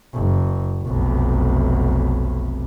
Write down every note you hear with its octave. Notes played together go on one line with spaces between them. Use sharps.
F#1
F1 B1